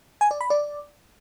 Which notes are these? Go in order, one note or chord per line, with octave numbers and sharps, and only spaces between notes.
G#5
D5
B5
D5